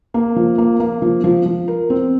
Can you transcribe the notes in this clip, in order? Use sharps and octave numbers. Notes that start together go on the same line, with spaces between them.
A#3
F3
A#3
A#3
F3
F3
F3
A#4
C4